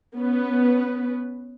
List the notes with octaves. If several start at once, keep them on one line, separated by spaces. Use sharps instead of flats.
B3 C#4 B4